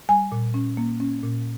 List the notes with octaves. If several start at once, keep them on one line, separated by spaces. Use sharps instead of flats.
G3 G#5
A#2
C#4
A#3
C#4
A#2